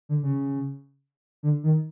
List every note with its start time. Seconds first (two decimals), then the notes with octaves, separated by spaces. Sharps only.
0.09 D3
0.23 C#3
1.43 D3
1.63 D#3